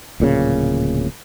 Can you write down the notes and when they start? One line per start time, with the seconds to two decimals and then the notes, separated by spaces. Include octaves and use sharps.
0.20 D1 A#2 C#3